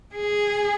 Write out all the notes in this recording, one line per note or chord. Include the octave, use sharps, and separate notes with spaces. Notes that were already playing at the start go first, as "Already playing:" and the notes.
G#4